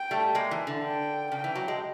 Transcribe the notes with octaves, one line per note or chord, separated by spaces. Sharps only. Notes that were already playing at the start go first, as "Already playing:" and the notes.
Already playing: G5
G3 A3
G#3 A#3
E3
D3
G5
C#3 G5
E3
F#3
G#3